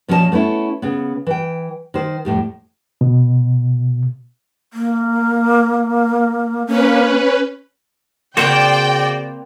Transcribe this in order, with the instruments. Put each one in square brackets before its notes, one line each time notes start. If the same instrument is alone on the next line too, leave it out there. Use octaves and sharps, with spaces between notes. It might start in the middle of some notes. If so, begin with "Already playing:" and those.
[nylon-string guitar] A#2 F3 C#4 C#5 D#5 A5
A3 B3 C#4 E4
C#3 B3
E3 G5
D#3 C5
F2 A2 G3
[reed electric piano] B2
[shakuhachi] A#3
[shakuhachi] A#3 [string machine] C#4 B4
[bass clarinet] C#3 [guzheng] A#3 C4 B4 [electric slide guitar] F#4 C5 [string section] D5 G5